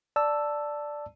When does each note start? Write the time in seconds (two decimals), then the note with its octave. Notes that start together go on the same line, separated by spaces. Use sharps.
0.16 D5 A5 E6